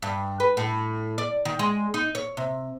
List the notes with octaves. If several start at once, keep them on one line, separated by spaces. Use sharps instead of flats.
G2
B4
A2
D5
D#3
G#3
D#4
C#5
C3